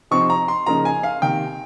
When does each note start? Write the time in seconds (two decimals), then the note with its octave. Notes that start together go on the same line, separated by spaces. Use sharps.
0.11 C3 F3 C4 D#4 C#6
0.30 A#5
0.48 C6
0.66 C#3 F3 A#3 D#4 A#5
0.85 G#5
1.03 F5
1.22 C3 D#3 A#3 G5